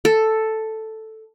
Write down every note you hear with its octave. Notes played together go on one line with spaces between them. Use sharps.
A4